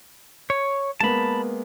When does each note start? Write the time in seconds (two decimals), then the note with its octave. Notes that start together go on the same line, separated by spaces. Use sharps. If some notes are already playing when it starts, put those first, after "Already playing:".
0.50 C#5
1.00 G#3 A#3 B3 A5 B5